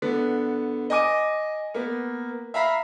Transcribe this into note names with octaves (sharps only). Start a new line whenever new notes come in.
D3 B3
D#5 G#5 D6 D#7
A#3 B3
E5 F5 A#5 B5 B6 C7